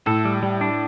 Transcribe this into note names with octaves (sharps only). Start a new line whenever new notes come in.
A2 A4
G3
G3
D4